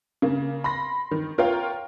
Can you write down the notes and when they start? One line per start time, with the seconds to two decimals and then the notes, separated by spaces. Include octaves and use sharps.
0.22 C#3 A#3
0.64 B5 C6 A#6
1.11 D#3
1.38 F4 A#4 C#5 F5 G5